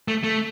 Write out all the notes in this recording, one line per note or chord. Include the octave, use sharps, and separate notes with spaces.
A3
A3